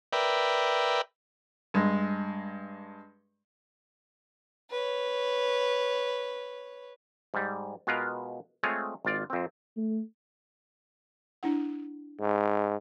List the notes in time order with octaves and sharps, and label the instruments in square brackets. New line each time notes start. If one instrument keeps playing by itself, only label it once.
[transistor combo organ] A#4 B4 D5 E5 G5
[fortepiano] G2 G#3
[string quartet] B4 C#5
[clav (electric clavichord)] G#2 G3
B2 G#3 F4 A#4 B4 F5
G#3 A3 C4 F4 G#4 C#5
G#1 F4 D5
F2 C4
[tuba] A3
[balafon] D4 E4 F#5
[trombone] G#2